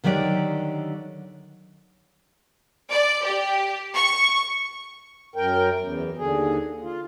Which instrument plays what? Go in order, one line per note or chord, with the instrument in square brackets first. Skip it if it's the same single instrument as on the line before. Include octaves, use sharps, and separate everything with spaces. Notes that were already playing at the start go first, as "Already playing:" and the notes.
[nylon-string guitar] D3 D#3 F#3 G4 D5
[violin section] D5
G4
C#6
[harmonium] F#2 A#4 G5
E2
D#2 D3 G#4
F4